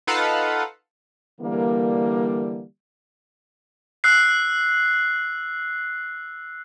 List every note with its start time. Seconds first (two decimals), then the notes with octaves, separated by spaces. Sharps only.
0.07 D#4 F4 A4 B4 F5 F#5
1.41 D3 E3 G3 A#3
4.04 E6 F#6 C7